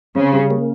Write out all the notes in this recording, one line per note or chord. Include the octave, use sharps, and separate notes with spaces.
C#3 C4
G3
A#3